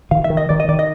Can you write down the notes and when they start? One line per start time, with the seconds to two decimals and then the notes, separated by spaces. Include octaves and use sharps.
0.11 D#3 F5
0.24 E5
0.30 D#3
0.37 D#5
0.49 D#3 D5
0.60 D#5
0.68 D#3 D5
0.79 D#5